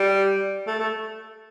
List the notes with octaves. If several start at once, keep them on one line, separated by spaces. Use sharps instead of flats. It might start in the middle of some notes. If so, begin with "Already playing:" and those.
Already playing: G3
A3
A3